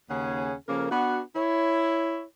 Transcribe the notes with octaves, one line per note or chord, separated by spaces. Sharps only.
D#2 C#3 C#4 G#4 F#5
C#3 F3 A#3 A4 A#4
B3 D4 F#4
E4 C#5